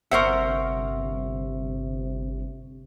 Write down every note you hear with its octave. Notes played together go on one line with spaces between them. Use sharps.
G1 C3 A#4 C5 E5 F#5 C#6